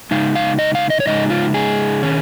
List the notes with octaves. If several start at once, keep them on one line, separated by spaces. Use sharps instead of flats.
C#3 G#3 D#4 F5
F5
D#5
F5
D#5
C#5
C#3 G#3 D#4 D#5
F4
G#4
D#3 C#4